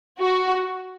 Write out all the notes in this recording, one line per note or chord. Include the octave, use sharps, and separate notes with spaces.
F#4